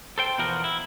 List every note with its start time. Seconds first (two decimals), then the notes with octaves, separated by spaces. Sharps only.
0.18 A4 C5 G5
0.38 E2 B2 F3 F#4 A#4
0.64 E4